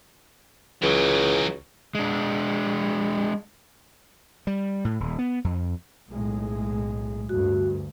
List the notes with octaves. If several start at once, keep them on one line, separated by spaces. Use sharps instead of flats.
C#2 E3 F#3
G#3 D4
G3
A2
D#1
B3
F2
B1 A2 G#3
D2 G2 F#4